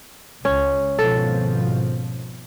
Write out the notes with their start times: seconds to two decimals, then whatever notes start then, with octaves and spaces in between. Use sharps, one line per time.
0.45 C#2 C#4
0.99 G#1 B2 F3 A4